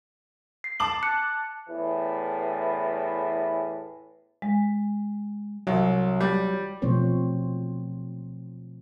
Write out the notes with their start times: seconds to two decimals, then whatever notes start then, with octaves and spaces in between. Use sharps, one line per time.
0.64 C7
0.80 A5 D6 F#7
1.03 F#6 C#7
1.69 E2 A2 E3
4.42 G#3
5.67 C2 F#3
6.21 G3
6.82 B2 F3 A3 C4 C5 C#5